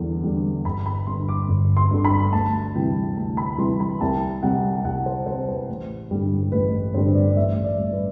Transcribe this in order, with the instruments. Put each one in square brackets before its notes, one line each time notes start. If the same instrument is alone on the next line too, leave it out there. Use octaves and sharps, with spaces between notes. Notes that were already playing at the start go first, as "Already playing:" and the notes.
Already playing: [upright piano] E2 D3 G3
D3 G3
G1 B5
B5
G2 D3 C6
D6
G1
C6
G2 D3
B5
D2 A5
C3 E3 G3 G5
D2 A5
B5
C3 E3 G3 C6
B5
C2 A5
C3 G3 F#5
C2 F#5
C5
C3 G3 C5
B4
A1
G2 D3 G3
A1 B4
G2 D3 G3 C5
D5
D5
A1 E5
D5
G3
A2
B4